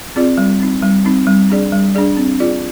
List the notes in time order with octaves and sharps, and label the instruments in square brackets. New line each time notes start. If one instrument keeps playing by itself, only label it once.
[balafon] C4 F4 G#4 D5
G3
C4 D#4
G3
C4 D#4
G3
D4 G#4 D5
G3
D4 G#4 D5
C4
F4 G#4 D5